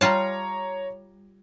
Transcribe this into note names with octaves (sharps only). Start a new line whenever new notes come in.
G3 F4 C#5 A5 A#5